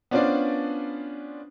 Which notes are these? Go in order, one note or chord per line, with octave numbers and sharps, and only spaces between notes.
B3 C#4 D4 F4 C5 D5